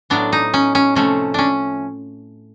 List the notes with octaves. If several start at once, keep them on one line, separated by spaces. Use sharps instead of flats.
A2 F#3 B3 D4
D#4
C#4
C#4
C3 F3 A3 C#4
C#4 D4